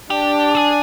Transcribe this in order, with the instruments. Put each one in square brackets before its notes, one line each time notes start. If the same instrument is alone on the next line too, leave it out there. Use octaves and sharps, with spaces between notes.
[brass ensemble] D4 [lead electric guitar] G4
[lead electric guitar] G#4